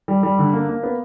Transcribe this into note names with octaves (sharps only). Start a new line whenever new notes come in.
G3
G3
D3
A#3
A#3
B3